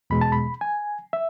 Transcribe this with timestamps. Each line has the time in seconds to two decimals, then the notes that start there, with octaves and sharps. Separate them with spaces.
0.10 E2 B2 G#3 B5
0.21 A5
0.32 B5
0.61 G#5
1.13 E5